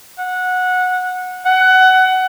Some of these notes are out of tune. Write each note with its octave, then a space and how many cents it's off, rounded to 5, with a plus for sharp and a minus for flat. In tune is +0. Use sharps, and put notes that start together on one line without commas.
F#5 -15
F#5 +20